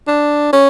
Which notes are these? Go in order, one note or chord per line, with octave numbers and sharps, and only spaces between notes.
D4
C#4